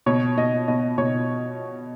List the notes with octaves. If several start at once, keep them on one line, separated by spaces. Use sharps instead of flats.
B2 C#5
B2 D#5
B2 D#5
B2 C#5